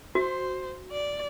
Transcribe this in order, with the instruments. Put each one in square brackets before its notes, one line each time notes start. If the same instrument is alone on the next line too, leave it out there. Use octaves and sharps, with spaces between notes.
[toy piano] F#4 [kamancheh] C5
[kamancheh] D5